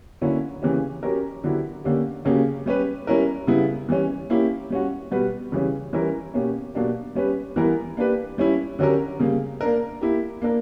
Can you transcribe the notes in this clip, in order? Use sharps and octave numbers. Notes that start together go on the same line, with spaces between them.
D3 F#3 A#3 C#4 E4
C#3 E3 A#3 C#4 G4
F#3 C#4 G4 A#4
D3 F#3 B3 E4 G4
D3 A#3 C#4 G4
C#3 F#3 A#3 C#4 G4
G3 C#4 G4 B4
G3 C#4 E4 A#4
C#3 G3 B3 E4
E3 G3 C#4
A#3 C#4 E4 G4
G3 C#4 F#4
B2 G3 B3 F#4 B4
C#3 E3 G3 C#4
E3 G3 C#4 E4 A#4
B2 A#3 C#4 G4
B2 F#3 A#3 D4 G4
G3 C#4 G4 B4
E3 G3 B3 E4 A#4
A#3 D4 G4 B4
G3 C#4 E4
D3 F#3 C#4 G4 A#4
C#3 G3 A#3
A#3 D4 A#4
A#3 E4 G4
A#3 D4 A#4